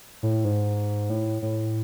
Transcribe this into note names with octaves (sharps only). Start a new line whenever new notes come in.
A2
G#2
A2
A2